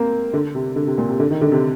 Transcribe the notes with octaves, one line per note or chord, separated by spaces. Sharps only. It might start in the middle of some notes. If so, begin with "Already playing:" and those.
Already playing: A#3 C4
D3
C3
D3
C3
A#2
C3
D3
D#3
D3
C3